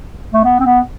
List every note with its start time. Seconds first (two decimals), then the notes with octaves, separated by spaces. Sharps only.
0.33 A3
0.45 B3
0.60 C4
0.65 B3